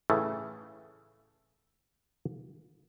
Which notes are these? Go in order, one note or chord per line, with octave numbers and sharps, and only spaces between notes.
A2 C#3 E3 A3 A4